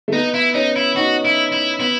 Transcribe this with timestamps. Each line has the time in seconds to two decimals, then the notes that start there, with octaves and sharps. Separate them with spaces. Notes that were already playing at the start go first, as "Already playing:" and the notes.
0.08 A3
0.12 B3 D#4
0.34 E4
0.54 C#4 D#4
0.76 E4
0.96 D#4 F#4
1.25 E4
1.52 E4
1.80 B3 E4